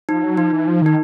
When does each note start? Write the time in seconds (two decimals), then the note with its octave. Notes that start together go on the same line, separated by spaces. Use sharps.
0.09 F3 D#4
0.24 F#3
0.37 F3 D#4
0.53 E3
0.67 F3
0.82 D#3 D#4